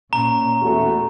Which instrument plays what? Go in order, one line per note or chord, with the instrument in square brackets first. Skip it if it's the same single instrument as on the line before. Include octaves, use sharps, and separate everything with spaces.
[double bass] A#2 C#4 [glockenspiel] A#5
[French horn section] E2 A3 F#4